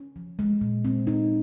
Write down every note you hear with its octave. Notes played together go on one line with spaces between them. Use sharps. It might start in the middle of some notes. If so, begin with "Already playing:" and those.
Already playing: C#4
F3
G#3
A#2
C4
D#4